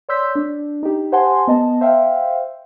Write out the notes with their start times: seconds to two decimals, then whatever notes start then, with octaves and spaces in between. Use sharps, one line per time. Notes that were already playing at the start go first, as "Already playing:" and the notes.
0.09 C#5 D5 C6 E6 G6 B6
0.35 D4
0.83 D#4 G4
1.12 G4 C5 F#5 G#5 A5 C6
1.47 B3 D#5 A5
1.81 C5 E5 F5 G5